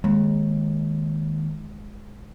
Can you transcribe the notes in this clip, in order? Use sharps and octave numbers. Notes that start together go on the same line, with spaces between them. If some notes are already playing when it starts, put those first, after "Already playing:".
D#2 G#3